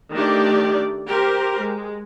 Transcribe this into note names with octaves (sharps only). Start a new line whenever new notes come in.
D#3 A3 D4 G4 D5
G4 A#4 C5
G#3